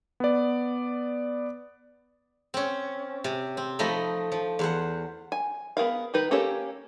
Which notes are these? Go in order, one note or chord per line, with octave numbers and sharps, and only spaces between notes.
B3 D5
C4 C#4
C3
C4
F3 A3 D#4 D#5 B5
F3
E2 C5 F#5
G#5
B3 G#4 A#4 F5
D#3 D#4 B4
A#3 C#4 G4 A4 C#5